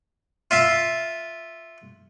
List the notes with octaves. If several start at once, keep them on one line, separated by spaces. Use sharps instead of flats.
F4 E5 F5